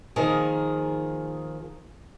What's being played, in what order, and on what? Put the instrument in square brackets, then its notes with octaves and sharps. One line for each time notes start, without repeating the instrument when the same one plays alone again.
[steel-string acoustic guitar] D#3 F3 A#3 G#4